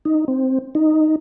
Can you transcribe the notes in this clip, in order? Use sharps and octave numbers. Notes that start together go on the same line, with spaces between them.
D#4
C4
D#4